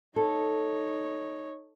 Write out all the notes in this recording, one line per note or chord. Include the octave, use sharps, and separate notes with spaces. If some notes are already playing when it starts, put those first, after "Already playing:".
D#4 A4 C#5